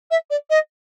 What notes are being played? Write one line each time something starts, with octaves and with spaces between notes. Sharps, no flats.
E5
D5
D#5